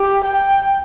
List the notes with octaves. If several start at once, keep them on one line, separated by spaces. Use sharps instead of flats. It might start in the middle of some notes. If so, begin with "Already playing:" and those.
Already playing: G4
G5